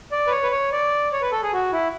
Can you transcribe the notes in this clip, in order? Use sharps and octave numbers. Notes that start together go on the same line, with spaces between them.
D5
B4
C#5
B4
C#5
D5
C#5
B4
A4
G#4
F#4
E4